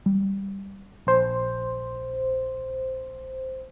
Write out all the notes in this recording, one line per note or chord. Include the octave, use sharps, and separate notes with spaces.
G3
A#1 C5